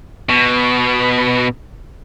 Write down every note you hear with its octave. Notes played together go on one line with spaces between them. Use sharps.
B2